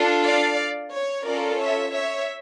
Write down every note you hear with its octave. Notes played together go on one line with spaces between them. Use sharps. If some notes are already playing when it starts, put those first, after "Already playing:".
Already playing: D4 F4 A4
D5 F5
C#5
C#4 F4 A4 A#4 D5
C#5 E5
C#5 E5